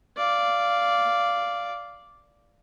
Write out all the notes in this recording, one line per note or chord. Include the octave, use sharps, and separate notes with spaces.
D5 F5